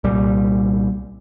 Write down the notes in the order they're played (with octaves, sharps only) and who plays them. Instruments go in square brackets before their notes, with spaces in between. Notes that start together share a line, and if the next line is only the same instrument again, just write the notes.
[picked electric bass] C2 A#2 G3